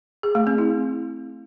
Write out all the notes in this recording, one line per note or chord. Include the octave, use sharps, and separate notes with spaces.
G#4
A3
C4
E4